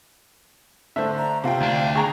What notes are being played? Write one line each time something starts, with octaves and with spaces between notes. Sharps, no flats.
D3 A3 C5 E5
A#5
C3 C4 F4 F5 G5
D2 D4
G#4 G5 G#5 A#5 C#6 F7